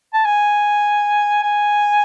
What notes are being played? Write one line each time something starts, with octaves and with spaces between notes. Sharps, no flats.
A5
G#5
G#5